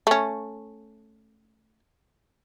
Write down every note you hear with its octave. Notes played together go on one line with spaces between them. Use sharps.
A3 C#4